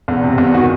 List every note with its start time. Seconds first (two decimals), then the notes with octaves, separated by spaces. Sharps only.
0.08 E2
0.23 C3
0.38 E2
0.53 D#3 F#4